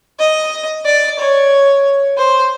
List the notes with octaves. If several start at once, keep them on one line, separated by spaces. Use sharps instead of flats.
D#5
D5
C#5
C5